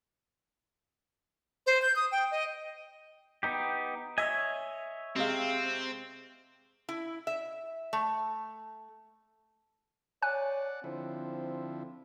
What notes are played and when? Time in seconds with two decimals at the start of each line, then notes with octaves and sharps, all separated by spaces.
1.67 C5
1.82 G6
1.96 D#6
2.12 G5
2.31 D#5
3.43 B3 D#4 G4
4.18 C#5 D#5 E5 G#5
5.16 C3 G#3 C4 F5
6.89 E4
7.27 E5
7.93 A3
10.22 C#5 D5 F#5 G#5 F#6
10.84 D3 F3 C4 E4